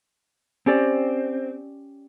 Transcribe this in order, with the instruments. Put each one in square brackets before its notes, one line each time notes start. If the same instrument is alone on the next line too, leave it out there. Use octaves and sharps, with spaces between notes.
[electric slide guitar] C4 [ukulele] C#4 G4 D5